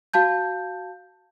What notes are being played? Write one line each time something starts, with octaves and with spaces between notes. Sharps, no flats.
F#4 F5 A5 G6